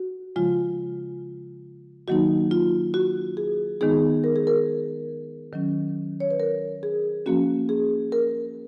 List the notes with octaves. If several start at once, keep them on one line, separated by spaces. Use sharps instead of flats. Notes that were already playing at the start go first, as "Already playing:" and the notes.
Already playing: F#4
C#3 F3 G#3 F4
D#3 F#3 A#3 D#4 F#4
F4
F#4
G#4
D#3 G#3 B3 D#4 G#4
A#4
G#4
A#4
D#3 F#3 C#4
C#5
B4
A#4
G#4
F3 A#3 C#4 F#4
G#4
A#4